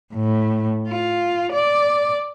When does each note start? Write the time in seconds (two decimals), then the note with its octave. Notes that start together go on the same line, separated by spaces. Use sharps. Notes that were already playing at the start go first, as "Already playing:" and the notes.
0.14 A2
0.88 F4
1.53 D5